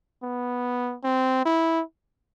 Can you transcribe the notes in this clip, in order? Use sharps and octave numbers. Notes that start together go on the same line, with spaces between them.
B3
C4
E4